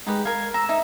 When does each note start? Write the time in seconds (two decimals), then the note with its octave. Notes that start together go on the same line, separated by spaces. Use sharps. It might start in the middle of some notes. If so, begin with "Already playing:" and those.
0.06 G#3 D#4 G4 B4
0.25 A#4 F5 G#6
0.54 A#5 E6
0.69 D#4 E5